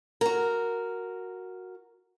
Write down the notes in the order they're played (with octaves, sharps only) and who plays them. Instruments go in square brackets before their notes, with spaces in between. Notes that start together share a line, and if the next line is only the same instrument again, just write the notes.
[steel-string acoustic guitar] F#4 A#4